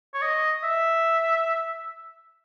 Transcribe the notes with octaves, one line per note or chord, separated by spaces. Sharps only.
C#5
D#5
E5